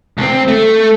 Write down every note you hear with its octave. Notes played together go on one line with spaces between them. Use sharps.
C#2 C4
A3